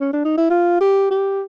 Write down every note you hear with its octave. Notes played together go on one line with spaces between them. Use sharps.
C#4
D4
D#4
E4
F4
G4
G4